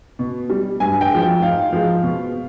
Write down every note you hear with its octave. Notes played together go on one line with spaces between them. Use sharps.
B2
G3
G2 G#5
G5
F3 G#3
G5
G#2 F5
F3 G#3
B2